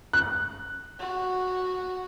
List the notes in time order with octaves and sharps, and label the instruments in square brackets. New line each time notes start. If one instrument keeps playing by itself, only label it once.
[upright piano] F#6
[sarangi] F#4